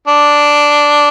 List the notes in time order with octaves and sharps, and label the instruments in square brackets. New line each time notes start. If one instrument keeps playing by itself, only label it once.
[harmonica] D4